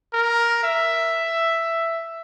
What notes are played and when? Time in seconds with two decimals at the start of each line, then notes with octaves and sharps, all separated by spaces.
0.14 A#4
0.64 E5